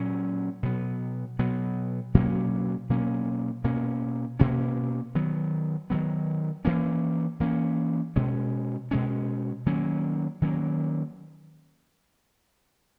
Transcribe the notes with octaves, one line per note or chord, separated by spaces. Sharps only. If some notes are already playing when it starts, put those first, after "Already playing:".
Already playing: A#2 F#3 C#4
B2 F#3 B3
B2 F#3 B3
B2 F#3 A#3 C#4
B2 F#3 A#3 C#4
B2 A#3 C#4
B2 A#3 C#4
D#3 F#3 B3
D#3 F#3 B3
E3 A#3 C#4
E3 A#3 C#4
B2 G#3 C#4
B2 G#3 C#4
D#3 F#3 A#3 C#4
D#3 F#3 A#3 C#4